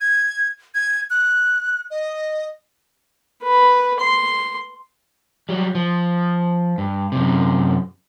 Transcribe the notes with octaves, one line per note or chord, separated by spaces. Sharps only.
G#6
G#6
F#6
D#5
B4
C6
F#3 G3
F3
G2
F#2 C3